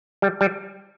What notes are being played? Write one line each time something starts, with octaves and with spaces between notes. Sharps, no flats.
G3
G3